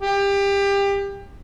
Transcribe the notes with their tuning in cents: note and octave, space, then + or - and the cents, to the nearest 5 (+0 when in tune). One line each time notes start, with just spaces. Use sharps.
G4 +25